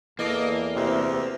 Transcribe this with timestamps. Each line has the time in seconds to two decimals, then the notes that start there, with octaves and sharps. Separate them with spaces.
0.19 E2 E3 A#3 A4 D#5
0.76 D2 C3 E3